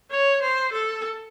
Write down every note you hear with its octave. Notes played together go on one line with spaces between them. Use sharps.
C#5
C5
A4